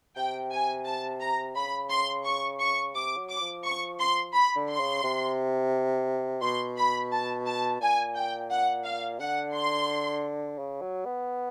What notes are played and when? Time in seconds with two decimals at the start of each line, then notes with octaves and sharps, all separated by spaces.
0.16 C3 G5
0.52 G#5
0.85 A5
1.20 A#5
1.56 C#3 B5
1.90 C6
2.24 C#6
2.60 C#6
2.95 C3 D6
3.17 F#3
3.29 D6
3.41 F3
3.64 C#6
3.99 C6
4.33 B5
4.56 D3
4.69 C6
4.80 C#3
5.03 C3
6.41 B2 C6
6.77 B5
7.12 A5
7.46 A5
7.81 A#2 G#5
8.15 G5
8.50 F#5
8.85 F5
9.20 D3 F#5
9.54 C6
10.59 C#3
10.81 F#3
11.05 B3